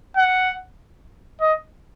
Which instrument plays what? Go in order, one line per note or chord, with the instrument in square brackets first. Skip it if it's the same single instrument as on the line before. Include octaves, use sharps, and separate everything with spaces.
[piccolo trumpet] F#5
D#5